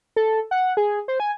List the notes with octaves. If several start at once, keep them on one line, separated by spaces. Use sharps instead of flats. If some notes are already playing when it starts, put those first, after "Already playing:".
A4
F#5
G#4
C5
G#5